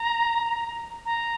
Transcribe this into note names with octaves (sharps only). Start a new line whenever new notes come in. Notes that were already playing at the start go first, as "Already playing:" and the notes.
Already playing: A#5
A#5